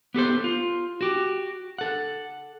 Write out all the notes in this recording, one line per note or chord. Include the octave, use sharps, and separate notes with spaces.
B3 G4 A4 C5
F4
F#4 G4
A4 F#5